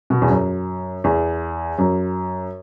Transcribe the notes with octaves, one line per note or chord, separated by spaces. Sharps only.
B2
E2
F#2
E2
F#2